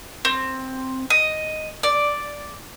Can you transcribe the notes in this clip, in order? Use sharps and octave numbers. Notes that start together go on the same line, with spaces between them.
C4
D#5
D5